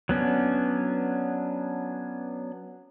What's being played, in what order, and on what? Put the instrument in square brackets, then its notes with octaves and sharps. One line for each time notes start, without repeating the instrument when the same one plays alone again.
[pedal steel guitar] F#3 B3 C#4 D4